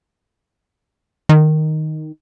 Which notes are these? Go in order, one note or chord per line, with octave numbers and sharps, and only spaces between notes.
D#3